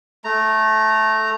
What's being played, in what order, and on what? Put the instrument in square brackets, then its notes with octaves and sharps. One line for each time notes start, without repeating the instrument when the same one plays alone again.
[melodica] A3 A#5